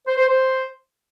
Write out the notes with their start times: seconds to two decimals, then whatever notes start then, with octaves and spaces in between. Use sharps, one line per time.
0.07 C5
0.17 C5
0.28 C5